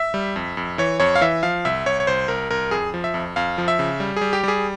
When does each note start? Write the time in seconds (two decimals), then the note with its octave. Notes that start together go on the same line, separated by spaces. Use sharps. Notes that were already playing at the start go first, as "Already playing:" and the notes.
Already playing: E5
0.14 G3
0.36 F2
0.57 F2
0.78 E3 C#5
1.00 F2 C#5
1.15 F5
1.21 E3 E5
1.43 F3 F5
1.65 C2 E5
1.86 C2 C#5
2.00 C#5
2.07 C2 C5
2.28 C2 A#4
2.50 C2 A#4
2.71 F2 G#4
2.94 F3
3.04 E5
3.14 F2
3.36 F2 F5
3.58 F3
3.68 E5
3.79 C#3
4.00 G3
4.17 G3 G#4
4.33 G4
4.43 G3 G#4